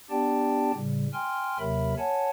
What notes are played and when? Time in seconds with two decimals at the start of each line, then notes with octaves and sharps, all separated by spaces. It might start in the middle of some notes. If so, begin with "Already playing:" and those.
0.10 B3 D4 G4 D5 G5 A5
0.74 A2 C#3 G3
1.13 G5 G#5 C6 F6
1.59 D#2 C3 F#3 A#4 E5 B5
1.98 C#5 F#5 G#5 A5